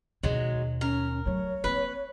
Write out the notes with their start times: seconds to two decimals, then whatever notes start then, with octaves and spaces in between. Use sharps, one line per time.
0.23 D#2 B2 F#3 G#3
0.81 C#4 A#4
1.25 F#3 A3 C#5
1.64 A#3 C4 B4